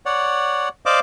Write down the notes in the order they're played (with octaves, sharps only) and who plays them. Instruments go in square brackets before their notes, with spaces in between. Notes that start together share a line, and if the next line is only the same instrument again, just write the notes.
[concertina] C#5 D5 F#5
C5 D5 D#5 F5 D6